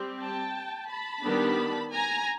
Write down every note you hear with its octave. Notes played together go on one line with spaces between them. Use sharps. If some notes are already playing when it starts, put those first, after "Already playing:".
Already playing: G3 C4
G5 A5
A5 B5
D#3 G3 B3 D4
G#5 A#5